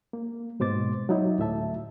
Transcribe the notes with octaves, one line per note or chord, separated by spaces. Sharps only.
A#3
G#2 B2 C5 D6 A6
F#3 D#4 E4
D2 A2 E5 A5